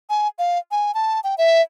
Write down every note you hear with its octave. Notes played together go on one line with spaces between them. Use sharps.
G#5
F5
G#5
A5
G5
E5